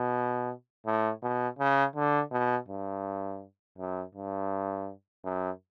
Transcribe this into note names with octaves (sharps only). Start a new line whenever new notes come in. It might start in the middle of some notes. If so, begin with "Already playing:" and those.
Already playing: B2
A2
B2
C#3
D3
B2
G2
F#2
G2
F#2